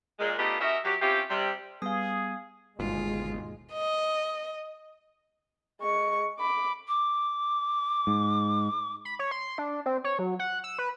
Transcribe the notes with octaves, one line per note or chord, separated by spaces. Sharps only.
A#2 G#3
A3 B3 D4 D#4 F4 G4
C#4 F#4 A#4 D#5 E5
F#3 G4
C4 C#4 E4 F4 G4
C3 G3
G3 B3 G#4 F5 G#5 D#6
G1 D#2 G#2 B2 G#3 F4
D#5
G#3 C#6
B5 D6
D6
G#2
B5
C#5
C6
D4
C4
C#5
F#3
F#5
E6
B4